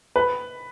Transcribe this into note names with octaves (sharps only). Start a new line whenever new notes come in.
B4